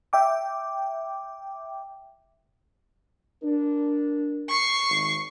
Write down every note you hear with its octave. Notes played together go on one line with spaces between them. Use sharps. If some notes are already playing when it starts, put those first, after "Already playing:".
E5 G5 D6
D4 A#4
C#6 C7
G#1